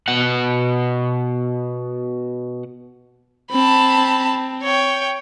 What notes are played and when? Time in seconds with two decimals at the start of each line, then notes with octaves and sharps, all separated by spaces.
0.08 B2 F#5
3.52 C4 A5 B5
4.63 C#5 G5